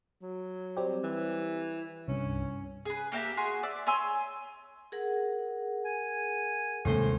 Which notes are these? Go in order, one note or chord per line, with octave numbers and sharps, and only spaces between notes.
F#3
G3 C4 G4
E3
C2 G2 C#4
G#4 B4
A#3 G4 E5 A#5
F#4 G#4 C6
D5 E5
C#5 G#5 C6 E6
G#4 A#4 F#5
G#5
D#2 A2 C3 G#3 A#3 C5 C6